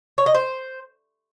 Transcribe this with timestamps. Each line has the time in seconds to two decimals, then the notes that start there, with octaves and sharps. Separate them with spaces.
0.18 C#5
0.26 D#5
0.34 C5